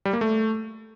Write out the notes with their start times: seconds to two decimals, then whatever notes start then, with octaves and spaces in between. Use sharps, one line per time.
0.05 G3
0.13 A#3
0.21 A3